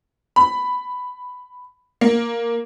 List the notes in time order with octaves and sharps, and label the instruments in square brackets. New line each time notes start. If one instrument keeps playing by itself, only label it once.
[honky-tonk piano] B5
A#3